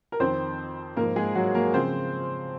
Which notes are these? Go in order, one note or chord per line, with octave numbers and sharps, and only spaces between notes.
A#4
F2 D#3 C4 C5
G#2 F3 A#3 A#4
G#3 G#4
F#3 F#4
A#3 A#4
C#3 F3 C4 C5